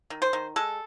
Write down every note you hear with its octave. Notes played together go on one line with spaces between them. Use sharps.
D#3
C5
D#3
G#3 A4